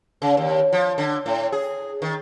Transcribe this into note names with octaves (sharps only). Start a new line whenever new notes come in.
C#3
D#2
F3
D3
A2
G#4
D#3